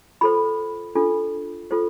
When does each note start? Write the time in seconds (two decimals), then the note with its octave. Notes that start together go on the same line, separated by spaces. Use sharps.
0.21 F4 A4 C5 B5
0.95 D4 F4 A4
1.71 F4 A4 C5